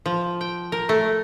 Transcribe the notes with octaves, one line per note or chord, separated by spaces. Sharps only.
F3
G5
A#4
A3